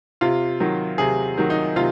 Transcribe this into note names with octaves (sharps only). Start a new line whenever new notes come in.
C3 F4
D#3 F#3
C3 G#4
D#3 F#3
D#4
C3 F4